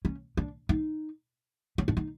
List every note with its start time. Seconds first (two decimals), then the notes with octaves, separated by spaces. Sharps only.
0.05 C#4
0.37 D4
0.69 D#4
1.78 C#4
1.88 D4
1.97 D#4